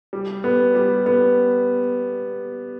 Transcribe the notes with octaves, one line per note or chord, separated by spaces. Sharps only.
G3
B3
G3
B3